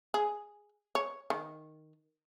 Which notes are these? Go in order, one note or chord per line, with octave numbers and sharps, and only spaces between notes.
G#4
C#5
D#3